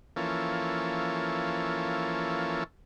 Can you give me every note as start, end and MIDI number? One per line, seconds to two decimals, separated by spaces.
0.16 2.64 52
0.16 2.64 53
0.16 2.64 58
0.16 2.64 61
0.16 2.64 69